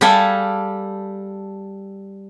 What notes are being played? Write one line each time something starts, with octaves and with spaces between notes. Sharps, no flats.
G3 G4 A4 F5 G#5